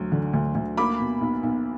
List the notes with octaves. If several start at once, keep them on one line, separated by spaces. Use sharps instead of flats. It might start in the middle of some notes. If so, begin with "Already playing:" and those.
Already playing: D2 F#3
D3
D2
D2
A#3 B5 D6
B2
B1
B1